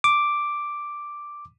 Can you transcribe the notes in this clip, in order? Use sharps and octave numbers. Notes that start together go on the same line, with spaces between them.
D6